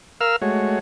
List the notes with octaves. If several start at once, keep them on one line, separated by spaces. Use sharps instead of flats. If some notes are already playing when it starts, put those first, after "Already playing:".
A#4 F5 E6 F6
G#3 A3 F#4 C#5